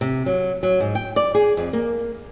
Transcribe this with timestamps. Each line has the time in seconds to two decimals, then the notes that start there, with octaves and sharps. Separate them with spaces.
0.01 C3
0.26 F#3
0.63 F#3
0.80 G#2
0.95 G5
1.16 D5
1.35 G#4
1.57 F2
1.73 A#3